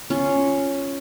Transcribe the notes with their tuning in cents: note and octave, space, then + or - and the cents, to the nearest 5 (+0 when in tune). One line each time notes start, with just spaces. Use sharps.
C#4 +0 F4 -10